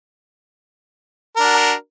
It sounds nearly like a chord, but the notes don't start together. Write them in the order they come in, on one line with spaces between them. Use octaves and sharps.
A#4 D4 F#4